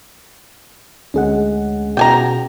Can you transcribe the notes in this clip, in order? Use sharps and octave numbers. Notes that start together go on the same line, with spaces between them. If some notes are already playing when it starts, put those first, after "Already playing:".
D2 G#3 C#4 G#4 F#5
B2 G5 G#5 A#5